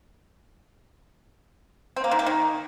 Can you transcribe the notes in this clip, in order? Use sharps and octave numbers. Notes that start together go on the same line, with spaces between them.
C4
A#3
D#3
A#3
D#3